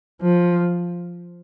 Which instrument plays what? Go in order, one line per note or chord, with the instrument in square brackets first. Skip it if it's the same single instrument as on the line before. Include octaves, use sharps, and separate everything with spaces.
[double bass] F3